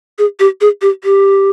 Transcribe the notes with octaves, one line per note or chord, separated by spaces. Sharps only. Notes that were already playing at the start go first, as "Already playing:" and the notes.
G#4
G4
G#4
G4
G4